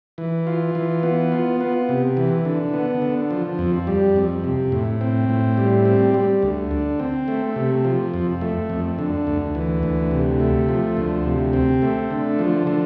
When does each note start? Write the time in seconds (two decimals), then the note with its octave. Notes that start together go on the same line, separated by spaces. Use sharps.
0.18 E3
0.47 F4
0.75 E3
1.03 B3
1.32 F4
1.61 B3
1.89 C3
2.17 E3
2.45 D3
2.74 B3
3.02 D3
3.31 F3
3.59 F2
3.87 G3
4.16 F2
4.44 C3
4.72 A2
5.01 C4
5.29 A2
5.58 G3
5.85 C4
6.14 G3
6.42 D2
6.71 D3
7.00 C4
7.28 A3
7.56 C3
7.85 F3
8.14 F2
8.41 A3
8.70 F2
8.99 D3
9.27 D2
9.55 E3
9.83 D2
10.11 C3
10.40 A3
10.69 F3
10.97 D2
11.25 C3
11.53 C4
11.82 A3
12.11 D3
12.39 F3
12.67 D3